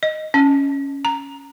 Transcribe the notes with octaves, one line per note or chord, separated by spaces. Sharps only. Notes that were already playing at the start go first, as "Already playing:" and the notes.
D#5
C#4
A#5